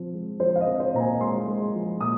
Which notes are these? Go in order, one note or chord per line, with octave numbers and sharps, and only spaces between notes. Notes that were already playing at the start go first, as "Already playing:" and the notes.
Already playing: F3 C4
G#3
F3 C5
F5
D#5
C4
C5
A#2 A#5
G#5
G#3 C6
G#3
F3
A#2 D#6